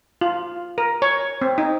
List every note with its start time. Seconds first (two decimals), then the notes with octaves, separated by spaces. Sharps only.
0.21 F4
0.78 A#4
1.02 C#5
1.42 C4
1.58 D#4